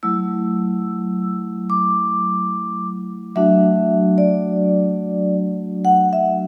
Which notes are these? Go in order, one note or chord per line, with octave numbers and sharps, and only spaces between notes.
F#3 A3 E4 E6
D6
F#3 A3 D4 F#4 E5
D5
F#5
E5